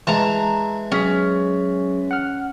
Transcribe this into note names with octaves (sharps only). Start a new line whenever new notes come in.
E3 G#3 A5 A#5
F#3 C#4 G#4 B6
F#5 F6